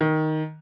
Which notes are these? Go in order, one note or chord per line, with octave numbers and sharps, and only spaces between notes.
D#3